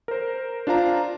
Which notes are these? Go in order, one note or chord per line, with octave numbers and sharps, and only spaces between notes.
A#4 C5
D4 F4 C5 F5 A#5